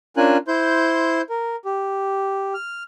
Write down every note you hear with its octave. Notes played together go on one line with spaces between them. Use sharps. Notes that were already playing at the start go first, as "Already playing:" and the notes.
C#4 D4 F4 A#4 G#5 F#6
E4 C5 C6 G6
A#4
G4
F6